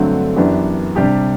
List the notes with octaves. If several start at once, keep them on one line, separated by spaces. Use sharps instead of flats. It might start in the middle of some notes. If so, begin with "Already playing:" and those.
Already playing: G2 D3 F#3 A3 C4
F#2 E3 B3 D4 G4
C3 G3 D4 G4